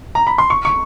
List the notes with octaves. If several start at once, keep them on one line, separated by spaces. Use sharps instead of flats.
A#5
B5
C6
C#6
C#6